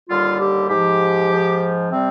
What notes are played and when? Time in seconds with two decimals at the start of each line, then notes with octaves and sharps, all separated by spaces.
0.09 D#2 D3 G3 F4
0.39 G4
0.69 G#2 F3 G4
1.29 G#2 F3
1.89 C3 G3 C4